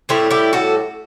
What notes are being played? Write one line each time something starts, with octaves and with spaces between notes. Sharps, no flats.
A2 G3 C4 E4
E4 G4
F#4 A4